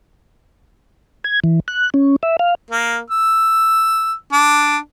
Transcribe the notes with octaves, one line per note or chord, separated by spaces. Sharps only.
G#6
E3
F#6
C#4
E5
F5
A#3
E6
D4